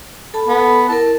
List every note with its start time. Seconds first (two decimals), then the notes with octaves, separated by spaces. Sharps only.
0.34 A4 A5 B5
0.48 B3
0.89 E4 A#4 A5